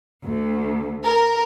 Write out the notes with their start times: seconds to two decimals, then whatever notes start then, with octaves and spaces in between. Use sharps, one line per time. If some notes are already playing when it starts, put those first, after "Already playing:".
0.23 D2
1.03 A#4